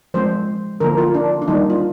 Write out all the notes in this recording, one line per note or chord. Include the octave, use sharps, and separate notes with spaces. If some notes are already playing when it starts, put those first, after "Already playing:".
F3 G#3 C4 C5
D3 F3 A#3 A#4
F4
D4
D4
D#3 G3 A#3 D#4
F4